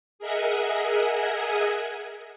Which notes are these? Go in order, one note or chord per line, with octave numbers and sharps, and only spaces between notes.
G#4 A#4 D#5 E5 F#5 G#5